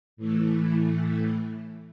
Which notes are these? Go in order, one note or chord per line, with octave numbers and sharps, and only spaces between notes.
A2 E3 A3